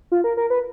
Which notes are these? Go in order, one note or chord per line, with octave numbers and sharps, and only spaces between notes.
F4
A#4
A#4
B4